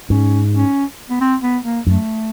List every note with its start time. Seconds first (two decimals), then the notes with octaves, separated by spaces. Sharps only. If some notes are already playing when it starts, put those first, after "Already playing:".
0.10 G#2 C#4
0.54 C#4
1.10 B3
1.21 C4
1.43 B3
1.65 A#3
1.86 F#2 A3